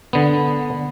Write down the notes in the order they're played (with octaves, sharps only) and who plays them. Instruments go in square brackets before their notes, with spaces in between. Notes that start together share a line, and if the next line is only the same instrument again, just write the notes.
[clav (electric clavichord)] D3 B3